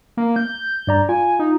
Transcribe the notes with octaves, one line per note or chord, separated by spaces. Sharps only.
A#3
G6
G2 D5 A#5
F4 G#5
D#4